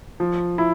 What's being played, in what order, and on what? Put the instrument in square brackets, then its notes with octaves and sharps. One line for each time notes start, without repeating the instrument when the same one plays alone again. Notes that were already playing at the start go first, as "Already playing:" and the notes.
[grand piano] F3
E4